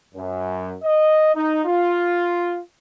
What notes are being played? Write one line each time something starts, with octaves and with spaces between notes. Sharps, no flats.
F#2
D#5
D#4
F4